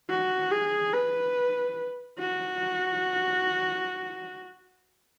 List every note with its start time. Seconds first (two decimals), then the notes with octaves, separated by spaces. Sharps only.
0.10 F#4
0.52 G#4
0.94 B4
2.19 F#4